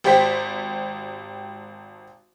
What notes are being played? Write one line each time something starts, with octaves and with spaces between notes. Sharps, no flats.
G#1 G4 C5 G5 B6